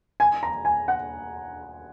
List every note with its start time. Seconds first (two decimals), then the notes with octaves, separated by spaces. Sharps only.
0.20 G#5
0.43 A#5
0.65 G#5
0.88 F#5